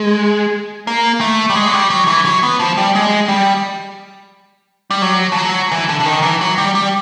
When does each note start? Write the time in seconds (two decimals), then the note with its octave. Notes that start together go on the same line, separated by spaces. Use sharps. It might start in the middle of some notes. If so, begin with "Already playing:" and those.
Already playing: G#3
0.87 A#3
1.21 A3
1.50 G3
1.55 G#3
1.68 F#3
1.74 G3
1.90 F#3
2.07 E3
2.25 F#3
2.43 B3
2.60 F3
2.77 G3
2.95 G#3
3.28 G3
4.91 G3
5.02 F#3
5.32 F3
5.36 F#3
5.71 E3
5.89 D3
6.00 D3
6.06 D#3
6.23 E3
6.41 F#3
6.58 G3
6.75 G3